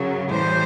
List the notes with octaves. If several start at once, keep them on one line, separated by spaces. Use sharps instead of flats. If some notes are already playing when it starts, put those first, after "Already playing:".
Already playing: F#2 C#3 F#3
A2 E3 G3 C5